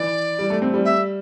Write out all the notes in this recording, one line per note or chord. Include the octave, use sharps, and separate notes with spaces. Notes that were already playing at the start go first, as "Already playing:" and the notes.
Already playing: E3 D5
G3
A3
C4
G3
E5